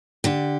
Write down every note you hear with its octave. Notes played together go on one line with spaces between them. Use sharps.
D3 G4